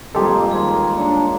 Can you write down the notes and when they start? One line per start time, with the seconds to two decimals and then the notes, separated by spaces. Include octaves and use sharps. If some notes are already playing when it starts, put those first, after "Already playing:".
0.15 F2 G3 G#3 A#3 F4 G4 A4
0.51 D#2 G#4 A#5
0.97 D4 C#5 A#5